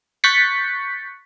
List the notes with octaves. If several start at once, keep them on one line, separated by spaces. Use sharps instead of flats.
C#6 F#6 G6 A6 B6 C#7